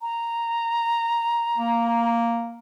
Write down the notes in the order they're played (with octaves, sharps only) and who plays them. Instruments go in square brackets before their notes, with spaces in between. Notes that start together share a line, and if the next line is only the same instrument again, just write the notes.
[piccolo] A#5
[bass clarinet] A#3